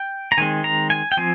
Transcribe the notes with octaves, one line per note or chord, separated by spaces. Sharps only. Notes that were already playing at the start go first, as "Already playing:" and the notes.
Already playing: G5
A#5
D#3 G#3 C4 G#5
A#5
G#5
G5
F3 C4 G#5